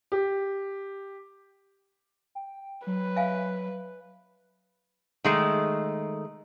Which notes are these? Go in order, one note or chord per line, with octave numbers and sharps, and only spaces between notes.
G4
G5
F#3 B4
E5 F5 G#5
D#3 G#3 A3